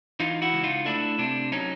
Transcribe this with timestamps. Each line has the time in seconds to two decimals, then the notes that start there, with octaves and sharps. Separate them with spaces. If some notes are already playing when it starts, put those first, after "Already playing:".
0.20 E3 D#4 F4
0.42 E4 F#4
0.53 C#2
0.63 D#4 F4
0.86 A3 D4 E4
1.19 C3 D4
1.52 F#3 C#4 D#4